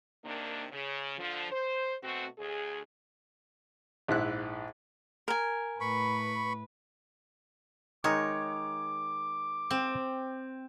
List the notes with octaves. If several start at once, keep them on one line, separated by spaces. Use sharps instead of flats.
C3 D#3 A#3 D4
C#3
D3 F3
C5
B2 A3 C4 F#4
D2 G#4
A#1 G#2 E4 F#6
A#4 G#5
A2 B4 B5 C#6
D#3 G#3 D#4 C#5 D6
C4